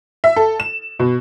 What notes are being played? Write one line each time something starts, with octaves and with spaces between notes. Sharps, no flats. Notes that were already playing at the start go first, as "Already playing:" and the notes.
E5
A4
E7
B2